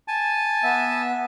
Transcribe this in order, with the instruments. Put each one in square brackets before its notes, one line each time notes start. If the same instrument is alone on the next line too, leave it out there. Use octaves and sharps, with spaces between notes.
[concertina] G#5 A5
[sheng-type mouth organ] B3 E5